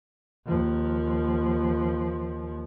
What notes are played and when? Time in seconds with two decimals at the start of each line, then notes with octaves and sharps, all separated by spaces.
0.46 D#2 F3